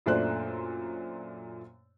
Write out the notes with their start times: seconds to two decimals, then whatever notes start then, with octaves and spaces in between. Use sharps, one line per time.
0.06 F#2 A#2 A3 D4 C5 F#6